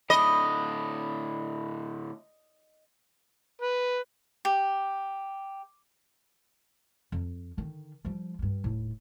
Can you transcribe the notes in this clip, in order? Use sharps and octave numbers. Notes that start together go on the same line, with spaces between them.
A2 D3 D#5 B5
B4
G4
F2
D3 D#3
F3 G3
G2 G3
D#1 A2